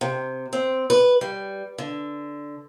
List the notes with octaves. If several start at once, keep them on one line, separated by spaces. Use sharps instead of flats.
C3
C4
B4
G3
D3